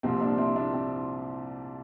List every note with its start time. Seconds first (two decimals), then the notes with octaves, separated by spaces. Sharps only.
0.03 C2 A#2 F3 C4
0.20 A#3 D4
0.38 C4 E4
0.56 A#3 D4
0.73 C4